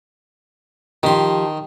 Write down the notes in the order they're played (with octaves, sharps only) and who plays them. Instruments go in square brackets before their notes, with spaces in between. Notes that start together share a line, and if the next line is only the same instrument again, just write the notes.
[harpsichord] D#3 C6 [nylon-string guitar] F3 G4